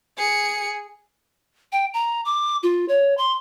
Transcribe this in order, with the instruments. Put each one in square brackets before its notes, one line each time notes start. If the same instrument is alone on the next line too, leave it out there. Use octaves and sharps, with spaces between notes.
[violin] G#4 C#7
[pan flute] G5
A#5
D6
F4
C#5
C6